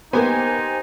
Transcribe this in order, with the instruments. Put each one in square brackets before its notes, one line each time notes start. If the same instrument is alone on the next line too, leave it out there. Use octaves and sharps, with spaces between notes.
[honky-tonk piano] A#3 B3 [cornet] D#4 [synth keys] G4 C5 G#5